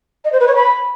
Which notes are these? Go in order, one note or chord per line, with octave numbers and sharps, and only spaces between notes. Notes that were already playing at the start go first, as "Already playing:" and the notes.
D#5
C5
B4
C#5
B5